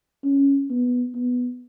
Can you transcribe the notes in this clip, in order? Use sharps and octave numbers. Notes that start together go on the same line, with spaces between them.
C#4
B3
B3